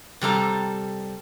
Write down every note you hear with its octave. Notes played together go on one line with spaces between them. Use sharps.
C3 G3 A4 A#5